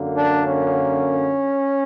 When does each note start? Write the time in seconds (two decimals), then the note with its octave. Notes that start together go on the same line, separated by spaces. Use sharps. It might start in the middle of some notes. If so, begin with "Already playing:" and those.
Already playing: F#2 D3 A#3
0.15 D4
0.45 C#4